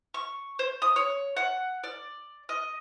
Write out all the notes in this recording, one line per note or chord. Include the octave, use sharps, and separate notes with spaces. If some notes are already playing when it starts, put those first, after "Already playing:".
C#6
C5
D#6
C#5
F#5
D5
D#5